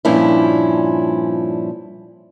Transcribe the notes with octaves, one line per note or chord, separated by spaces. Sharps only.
G2 A#2 F3 C#4 D4 E4